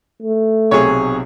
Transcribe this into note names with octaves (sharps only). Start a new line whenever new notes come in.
A3
B1 C3 G#4 C#5